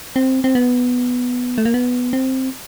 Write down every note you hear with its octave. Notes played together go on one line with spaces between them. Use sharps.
C4
C4
B3
A3
A#3
B3
C4